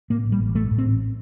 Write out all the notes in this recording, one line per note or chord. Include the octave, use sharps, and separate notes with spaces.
A2 A#3
A1
G3
A1
A2 A3
A2
C4
A1